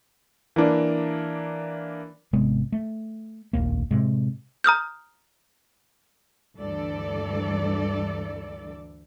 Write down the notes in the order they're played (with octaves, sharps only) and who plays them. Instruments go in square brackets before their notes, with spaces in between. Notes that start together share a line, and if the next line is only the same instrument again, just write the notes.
[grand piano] E3 A#3 D4
[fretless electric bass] G#1 C3 G#3 B3
A3
F1 A#1 D#2 A#3
A2 C3 G#3
[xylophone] A#5 D#6 F6 G6
[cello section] D2 G2 E3 A4 D5